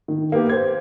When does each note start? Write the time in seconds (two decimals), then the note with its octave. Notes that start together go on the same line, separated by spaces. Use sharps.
0.08 D#3
0.32 A#3 B3 G4
0.49 C5 G#6